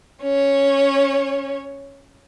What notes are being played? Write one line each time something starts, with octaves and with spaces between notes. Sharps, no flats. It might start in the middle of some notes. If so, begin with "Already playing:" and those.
C#4 C#5